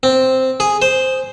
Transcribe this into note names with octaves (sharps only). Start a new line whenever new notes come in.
C4
G#4
C5